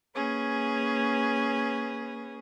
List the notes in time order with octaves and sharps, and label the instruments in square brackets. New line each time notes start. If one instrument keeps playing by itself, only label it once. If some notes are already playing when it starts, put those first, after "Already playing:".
[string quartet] A#3 C#4 G#4 B4